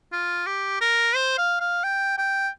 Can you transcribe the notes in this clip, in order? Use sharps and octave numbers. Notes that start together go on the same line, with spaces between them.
F4
G4
A#4
C5
F5
F5
G5
G5